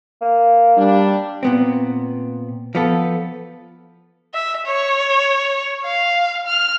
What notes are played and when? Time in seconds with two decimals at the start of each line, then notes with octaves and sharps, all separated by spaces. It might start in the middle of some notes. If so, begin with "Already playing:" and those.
0.21 A#3
0.78 G3 D4
1.43 A#2 B3 C4
2.75 F3 B3 A4
4.34 E5
4.66 C#5
5.85 F5
6.47 F6